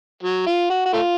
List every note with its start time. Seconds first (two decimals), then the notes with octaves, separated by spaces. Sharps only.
0.23 F#3
0.47 F4
0.70 F#4
0.86 F#4
0.93 A3 F4